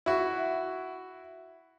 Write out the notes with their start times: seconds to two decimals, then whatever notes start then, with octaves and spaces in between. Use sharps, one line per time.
0.06 E4 F#4